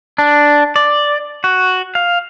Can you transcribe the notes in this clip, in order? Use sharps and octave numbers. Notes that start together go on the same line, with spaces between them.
D4
D5
F#4
F5